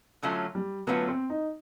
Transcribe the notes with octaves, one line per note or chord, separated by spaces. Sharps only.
D3 F#3 A3 C#4 F4
G3
D3 F#3 A3 B3 C#4 F4
C4
D#4